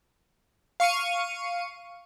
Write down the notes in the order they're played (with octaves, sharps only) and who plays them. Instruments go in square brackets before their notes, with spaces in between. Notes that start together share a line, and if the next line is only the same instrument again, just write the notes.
[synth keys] F5 C#6 C#7 D#7